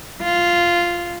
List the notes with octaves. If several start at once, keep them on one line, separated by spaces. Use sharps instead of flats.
F4